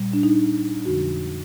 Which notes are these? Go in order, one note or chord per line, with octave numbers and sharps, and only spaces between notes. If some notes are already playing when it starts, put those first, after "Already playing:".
Already playing: A#2 G3
D4
D#4
F2 D3 F3 G#3 F#4